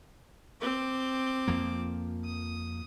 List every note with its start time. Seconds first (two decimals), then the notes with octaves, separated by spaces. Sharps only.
0.61 C4 D6
1.48 F2 F3 A#3
2.25 D#6